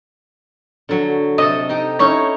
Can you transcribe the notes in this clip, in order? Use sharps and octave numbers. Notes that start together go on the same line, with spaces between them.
D3 F#3
C3 A4 D#5
D#4 G4
C#4 D#4 E4 C#5